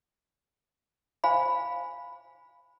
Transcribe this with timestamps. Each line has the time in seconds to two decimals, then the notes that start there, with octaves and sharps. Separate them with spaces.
1.24 C5 F5 G#5 B5